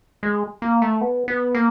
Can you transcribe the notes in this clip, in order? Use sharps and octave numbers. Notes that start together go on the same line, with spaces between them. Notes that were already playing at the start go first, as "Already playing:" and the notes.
G#3
A#3
A3
B3
B3
A#3